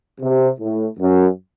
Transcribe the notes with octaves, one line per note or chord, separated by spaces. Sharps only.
C3
A2
F#2